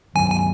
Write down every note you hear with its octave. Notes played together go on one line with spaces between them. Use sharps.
G2 D#3 F#3 G#5
G#5